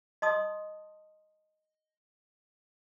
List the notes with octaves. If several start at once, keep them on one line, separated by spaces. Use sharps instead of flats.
D#5 A5 C6 D#6